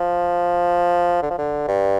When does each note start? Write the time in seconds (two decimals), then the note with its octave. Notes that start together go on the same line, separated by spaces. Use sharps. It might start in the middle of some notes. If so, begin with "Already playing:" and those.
Already playing: F3
1.22 D3
1.30 F3
1.38 D3
1.68 G2